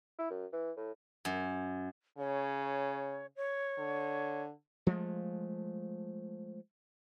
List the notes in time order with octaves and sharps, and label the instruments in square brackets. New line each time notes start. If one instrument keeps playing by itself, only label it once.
[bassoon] E4
F#2
E3
A2
[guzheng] F#2
[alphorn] C#3 [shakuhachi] C#5
[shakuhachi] C#5
[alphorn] D3
[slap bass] F3 G#3 A3